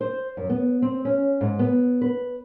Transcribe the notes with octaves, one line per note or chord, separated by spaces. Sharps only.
C5
F#2
B3
C4
C#4
G#2
B3
B4